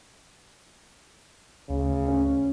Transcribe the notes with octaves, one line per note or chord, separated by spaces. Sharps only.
D2 C#3
C#4